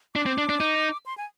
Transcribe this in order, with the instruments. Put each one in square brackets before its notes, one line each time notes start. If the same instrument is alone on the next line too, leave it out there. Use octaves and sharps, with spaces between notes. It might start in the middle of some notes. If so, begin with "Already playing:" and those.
[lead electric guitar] D4 [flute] D6
[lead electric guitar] C4
D4
D4
D#4
[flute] C6
G#5